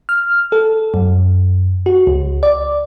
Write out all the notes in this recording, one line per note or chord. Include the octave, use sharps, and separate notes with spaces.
F6
A4
F#2
F#4
C#2
D5